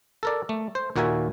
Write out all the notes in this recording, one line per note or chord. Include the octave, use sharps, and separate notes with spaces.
A4 A#4 D5
A3
C5
D#2 A#2 F#4 A#4 E5 G#5